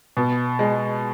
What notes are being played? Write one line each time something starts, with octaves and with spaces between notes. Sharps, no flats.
B2
G#3